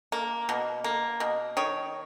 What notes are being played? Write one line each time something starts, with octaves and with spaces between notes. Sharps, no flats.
A#3
B2
A#3
B2
D#3 C#5